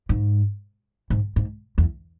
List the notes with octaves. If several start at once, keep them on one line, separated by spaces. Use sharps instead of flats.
G#2
G#2
G#2
E2